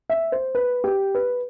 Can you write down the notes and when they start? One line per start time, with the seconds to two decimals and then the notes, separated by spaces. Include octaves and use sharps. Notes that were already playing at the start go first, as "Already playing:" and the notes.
0.10 E5
0.32 C5
0.55 B4
0.84 G4
1.15 B4